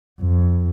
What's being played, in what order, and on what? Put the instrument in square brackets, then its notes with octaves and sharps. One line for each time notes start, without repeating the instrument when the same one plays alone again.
[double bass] F2